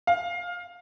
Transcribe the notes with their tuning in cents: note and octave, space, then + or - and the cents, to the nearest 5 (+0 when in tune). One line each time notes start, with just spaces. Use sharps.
F5 +15